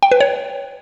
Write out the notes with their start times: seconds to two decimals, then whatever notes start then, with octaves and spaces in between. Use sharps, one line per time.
0.03 G5
0.12 B4
0.21 C#5